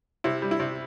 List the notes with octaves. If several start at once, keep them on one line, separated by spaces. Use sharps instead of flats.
C3 E4
G3
E4
C3